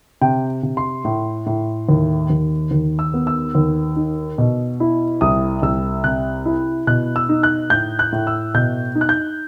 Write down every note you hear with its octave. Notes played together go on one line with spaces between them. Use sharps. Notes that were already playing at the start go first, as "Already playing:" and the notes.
C3 G5
C3
C6
A2
A2
D#2
D#2
D#2
E6
B3
E6
D#2
D#4
B2
E4
C2 D#6
C2 E6
C3 F#6
E4
B2 F#6
E6
D#4
F#6
A2 G6
F#6
A2
E6
B2 G6
D#4
F#6
G6